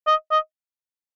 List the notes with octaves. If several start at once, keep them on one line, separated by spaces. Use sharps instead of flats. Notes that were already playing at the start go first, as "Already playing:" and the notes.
D#5
D#5